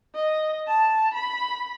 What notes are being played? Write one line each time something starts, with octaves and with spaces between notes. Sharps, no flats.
D#5
A5
B5